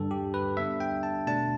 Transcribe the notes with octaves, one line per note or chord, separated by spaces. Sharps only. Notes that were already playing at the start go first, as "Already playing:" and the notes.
Already playing: G2 D3 G3 A4
G4
B4
D3 G3 B3 D4 E5
G5
A5
B2 A3 D4 A5